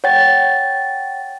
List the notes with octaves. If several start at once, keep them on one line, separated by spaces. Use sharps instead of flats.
C#5 F#5 G5 A6